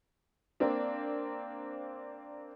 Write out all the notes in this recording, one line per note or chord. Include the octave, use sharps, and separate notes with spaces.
A#3 C4 D4